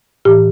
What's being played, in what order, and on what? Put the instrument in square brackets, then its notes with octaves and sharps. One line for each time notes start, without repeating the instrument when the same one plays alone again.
[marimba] A2 E3 G4